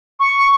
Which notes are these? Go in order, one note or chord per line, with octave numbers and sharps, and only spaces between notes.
C#6